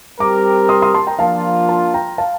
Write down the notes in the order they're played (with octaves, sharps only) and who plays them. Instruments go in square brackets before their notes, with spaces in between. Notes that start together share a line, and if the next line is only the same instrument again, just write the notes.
[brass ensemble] G3 C4 G4 A#4 [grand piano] A#5 D6
[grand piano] C6 D#6
C6 D#6
A5 C6
G5 A#5
[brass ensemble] F3 A#3 D4 F4 [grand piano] F5 A5
[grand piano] A5 C6
G5 A#5
F5 A5